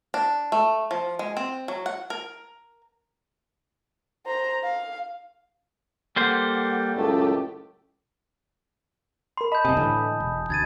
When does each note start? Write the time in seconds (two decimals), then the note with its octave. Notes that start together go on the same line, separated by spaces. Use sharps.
0.14 D4
0.52 A3
0.91 F3
1.19 G#3
1.37 C4
1.68 F#3
1.86 F#5
2.10 A#4
4.26 C5 A#5
4.64 F5
6.16 G3 A#3 A4 C5 F#5
6.96 C#2 F#2 A2 A3 G4
9.37 A#4 B5 C6
9.52 D#5 A5 B5 G6
9.65 F#1 C3 G#5 A5 D#6
9.77 A2 D3 E3
10.20 E1
10.50 D2 G#6 A6 D#7